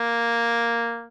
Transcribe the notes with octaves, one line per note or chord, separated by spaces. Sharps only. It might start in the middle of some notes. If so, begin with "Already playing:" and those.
Already playing: A#3